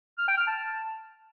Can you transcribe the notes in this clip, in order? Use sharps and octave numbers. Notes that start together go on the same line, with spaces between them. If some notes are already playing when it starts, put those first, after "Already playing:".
F6
G5
F6
A5